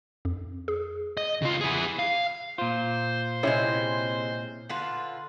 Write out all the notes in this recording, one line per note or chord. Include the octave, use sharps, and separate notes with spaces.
F2
G#4
D#5
C#3 F4
E4 G#4
F5
A#2 F4 C5
C3 F#3 G#3 C#4 E4
D3 F4 B4